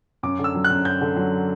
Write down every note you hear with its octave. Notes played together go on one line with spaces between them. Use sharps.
F#2 D6
D3
E6
F#3
F#6
F#2
F#2 G6
D3
F#3